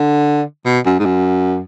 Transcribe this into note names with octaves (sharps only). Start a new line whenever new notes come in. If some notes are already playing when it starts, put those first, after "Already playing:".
Already playing: D3
B2
F#2
G#2
F#2